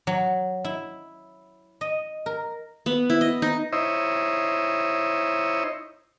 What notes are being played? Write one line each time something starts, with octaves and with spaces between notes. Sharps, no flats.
F#3
E4
D#5
A#4
B3
E4
D#5
D#4
D#4 E4 C5 C#5 D#5 E5